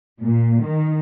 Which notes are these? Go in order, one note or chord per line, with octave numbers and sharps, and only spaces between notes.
A#2
D#3